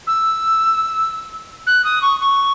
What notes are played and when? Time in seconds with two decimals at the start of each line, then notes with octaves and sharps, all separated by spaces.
0.07 E6
1.66 F#6
1.84 D#6
2.02 C#6
2.20 C#6